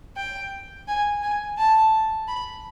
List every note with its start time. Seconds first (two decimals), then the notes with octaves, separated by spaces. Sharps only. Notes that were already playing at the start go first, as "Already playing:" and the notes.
0.17 G5
0.88 G#5
1.22 G#5
1.58 A5
2.28 B5